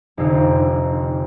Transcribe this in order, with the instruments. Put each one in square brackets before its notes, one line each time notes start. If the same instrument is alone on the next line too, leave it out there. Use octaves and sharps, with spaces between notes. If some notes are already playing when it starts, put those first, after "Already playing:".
[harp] F1 F2 D3 F3 D#4